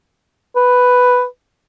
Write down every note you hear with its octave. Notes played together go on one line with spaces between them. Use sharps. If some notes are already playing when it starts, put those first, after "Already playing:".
B4